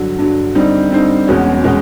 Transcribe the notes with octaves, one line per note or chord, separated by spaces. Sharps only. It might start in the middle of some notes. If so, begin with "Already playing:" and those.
Already playing: G2 D3 F#3
G2 D3 F#3
D3 G3 C4 D#4
D3 G3 C4 D#4
E1 E2 B2 G#3 C#4
B2 G#3 C#4